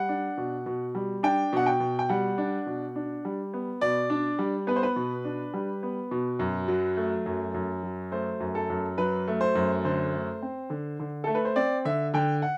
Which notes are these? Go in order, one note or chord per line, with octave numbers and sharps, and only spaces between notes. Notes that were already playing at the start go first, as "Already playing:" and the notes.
Already playing: G3 F#5
D4
B2
B2
G3
D4 G5
B2 F#5
G5
B2
G5
G3 F#5
D4
B2
D4
G3
B3
B2 D5
D4
G3
B3 B4
C5
B4
B2
D4
G3
B3
B2
F#2
F#3
A3
F#2
F#2
F#3
A3 C5
F#2
A4
F#2
F#3 B4
A3
C5
F#2
D3 C5
A3
C4
D3
D3
A3 A4
B4
C5
C4 D5
D3 E5
D3 G5
F#5